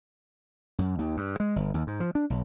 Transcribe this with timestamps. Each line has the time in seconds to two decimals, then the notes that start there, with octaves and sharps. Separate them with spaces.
0.78 F#2
0.99 D#2
1.17 G2
1.40 G#3
1.56 G1
1.74 D#2
1.87 G#2
2.00 F3
2.15 D4
2.30 B1